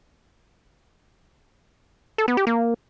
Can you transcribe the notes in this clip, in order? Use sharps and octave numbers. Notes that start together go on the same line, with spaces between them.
A4
B3
G4
A#3